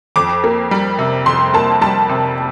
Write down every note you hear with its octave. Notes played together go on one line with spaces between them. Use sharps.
F2 D6
A#3
G3
C3
F2 C6
A#3 A5
G3 A5
C3